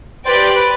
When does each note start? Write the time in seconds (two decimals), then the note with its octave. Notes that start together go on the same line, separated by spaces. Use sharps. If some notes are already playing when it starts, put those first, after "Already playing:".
0.25 G4 B4 C5 D5 G5
0.56 B4